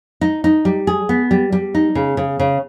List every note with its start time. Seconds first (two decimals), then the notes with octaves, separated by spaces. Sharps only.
0.21 D#4
0.44 D#4
0.65 G3
0.87 G#4
1.09 B3
1.31 G3
1.52 G3
1.75 D#4
1.95 C#3
2.17 C#3
2.39 C#3